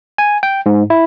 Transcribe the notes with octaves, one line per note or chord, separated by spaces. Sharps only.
G#5
G5
G#2
E4